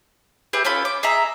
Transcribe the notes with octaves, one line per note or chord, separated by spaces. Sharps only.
G4 G#4 B4 E5
C#4 F4 A4 B5
D6
G#4 D#5 E5 A#5